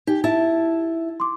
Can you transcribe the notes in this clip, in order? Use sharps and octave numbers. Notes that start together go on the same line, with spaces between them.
D#4 G4
E4 A5
C6 D6